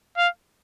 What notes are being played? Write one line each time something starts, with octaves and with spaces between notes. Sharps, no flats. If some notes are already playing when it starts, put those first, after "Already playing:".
F5